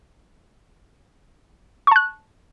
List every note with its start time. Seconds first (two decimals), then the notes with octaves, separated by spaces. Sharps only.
1.87 C#6
1.91 A5
1.96 F#6